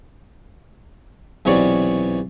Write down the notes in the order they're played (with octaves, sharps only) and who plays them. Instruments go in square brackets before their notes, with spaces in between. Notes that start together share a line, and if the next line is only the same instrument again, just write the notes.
[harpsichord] B1 C3 E3 F#4 C#5 D5